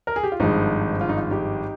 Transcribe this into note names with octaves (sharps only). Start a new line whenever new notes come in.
A#4
G#4
G4
F4
G#1 G2 F3 G#3 D#4
F4
D#4
F4
D#4 G4